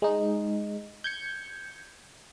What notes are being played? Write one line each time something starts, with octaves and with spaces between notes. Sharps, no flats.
G#3 D#4
G6 G#6 C#7